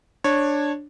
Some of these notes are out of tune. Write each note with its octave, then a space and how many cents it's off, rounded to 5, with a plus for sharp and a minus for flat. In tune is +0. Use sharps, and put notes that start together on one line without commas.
D4 +0 C#5 -15